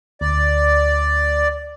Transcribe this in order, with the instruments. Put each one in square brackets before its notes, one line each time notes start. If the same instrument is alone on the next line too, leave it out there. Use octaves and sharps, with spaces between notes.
[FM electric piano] D2 [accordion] D5